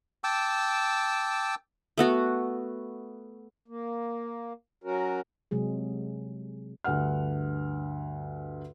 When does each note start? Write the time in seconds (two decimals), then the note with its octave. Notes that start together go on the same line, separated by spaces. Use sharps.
0.24 G5 A5 D6 E6
1.98 A3 B3 F#4
3.68 A#3
4.84 F#3 C#4 F#4 A#4
5.51 C3 F#3 G#3 G#4
6.84 D2 G2 F#5 F6